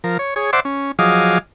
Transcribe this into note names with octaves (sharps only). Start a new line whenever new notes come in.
F3 A#4
C#5
G#4 C#5
C5 D5 E5 F#5 C6 D6
C#4
F3 F#3 G#4 D#5 F5 D6